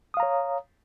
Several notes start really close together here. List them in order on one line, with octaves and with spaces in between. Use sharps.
D#6 F5 A#5 C#5